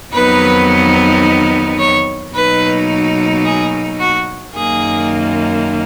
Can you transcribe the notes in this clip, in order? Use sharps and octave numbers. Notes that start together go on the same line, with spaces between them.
F2 D#3 F#3 B3 D#4 B4
C#5
B2 F#3 A#3 D#4 B4
G#4
F#4
F#2 D#3 A#3 G#4